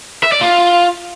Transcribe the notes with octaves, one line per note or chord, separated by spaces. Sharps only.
E5
D5
F4